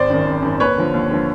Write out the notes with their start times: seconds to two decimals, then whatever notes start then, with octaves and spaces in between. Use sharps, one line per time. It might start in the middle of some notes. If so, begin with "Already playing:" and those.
Already playing: G#1 C5 D5
0.10 F#2 D#3
0.26 G#1
0.42 F#2 D#3
0.60 D#2 B4 C#5
0.77 D3 F3
0.93 D#2
1.10 D3 F3